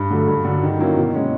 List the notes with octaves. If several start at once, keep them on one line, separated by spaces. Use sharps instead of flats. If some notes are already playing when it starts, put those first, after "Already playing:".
Already playing: G2
D3 F#3 A3
G2
D3 F#3
D#3
F#3 A#3 C#4 E4
B2
G#3 C#4